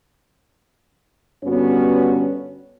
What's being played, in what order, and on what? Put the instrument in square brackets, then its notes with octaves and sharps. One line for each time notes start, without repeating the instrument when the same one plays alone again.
[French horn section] G2 D3 B3 C#4 F#4 C#5